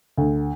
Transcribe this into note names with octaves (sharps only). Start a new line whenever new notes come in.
D2